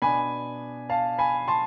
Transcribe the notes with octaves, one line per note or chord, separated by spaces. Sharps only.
B2 B3 D4 G#5 B5
F5 A5
G#5 B5
A5 C6